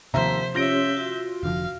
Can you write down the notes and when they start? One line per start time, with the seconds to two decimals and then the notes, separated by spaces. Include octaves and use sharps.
0.14 D#2 C3 F3 C5 E5 A#5 B6
0.55 C#4 F4 G4 C#5 E5 G6 A#6 D7
0.97 F#4
1.43 F1 D3 F3 F5